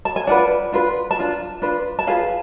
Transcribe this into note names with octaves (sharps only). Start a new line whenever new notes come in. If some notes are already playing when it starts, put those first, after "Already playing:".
A5
G#5
D4 F4 B4 D5 F#5
D4 F4 B4
A5
D4 F4
D4 F4 B4
A5
F4 G#4 B4 F5 G#5